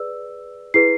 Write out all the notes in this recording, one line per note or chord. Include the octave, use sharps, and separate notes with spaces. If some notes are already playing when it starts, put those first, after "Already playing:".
Already playing: G#4 B4 D5 E6
E4 G#4 B4 C7